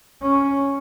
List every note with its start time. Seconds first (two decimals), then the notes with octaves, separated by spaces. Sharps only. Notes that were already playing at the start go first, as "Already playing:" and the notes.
0.22 C#4